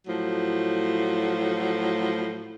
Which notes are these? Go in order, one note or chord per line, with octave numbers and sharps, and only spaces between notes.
A2 F3 F#3